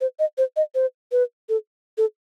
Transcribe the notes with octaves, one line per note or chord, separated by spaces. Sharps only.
C5
D#5
C5
D#5
C5
B4
A4
A4